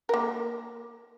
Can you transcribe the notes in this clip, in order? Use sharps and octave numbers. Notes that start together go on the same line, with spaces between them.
A#3 A#4